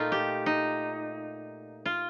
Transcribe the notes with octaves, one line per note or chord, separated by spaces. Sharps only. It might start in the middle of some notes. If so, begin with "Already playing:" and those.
Already playing: A#2 A3 D#4 F4
G4
D#4
F4